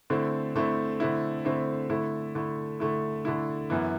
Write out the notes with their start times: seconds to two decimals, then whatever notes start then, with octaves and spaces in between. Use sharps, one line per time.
0.10 D3 A3 C4 E4
0.55 D3 A3 C4 E4
1.00 D3 A3 C4 E4
1.45 D3 A3 C4 E4
1.90 D3 A3 E4
2.35 D3 A3 E4
2.80 D3 A3 E4
3.25 D3 A3 E4
3.70 F#2 E3 B3 E4